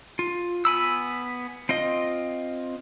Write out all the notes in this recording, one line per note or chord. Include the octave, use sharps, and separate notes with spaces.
F4
B3 G#5 B5 E6
C4 F4 D#5